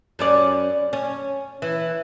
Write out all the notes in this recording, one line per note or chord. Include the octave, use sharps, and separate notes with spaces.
F#2 C#4 D5
C#4
E3